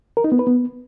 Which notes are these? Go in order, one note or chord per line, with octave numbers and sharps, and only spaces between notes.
A#4
D#4
B3
B4
B3